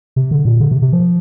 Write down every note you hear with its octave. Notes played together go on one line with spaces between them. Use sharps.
C3
D3
A#2
D3
C3
C3
F3